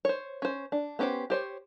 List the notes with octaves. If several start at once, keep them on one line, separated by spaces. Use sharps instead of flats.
C5 C#5
C#4 C5
D4
B3 C#4 G4 B4 C5
G4 C5 C#5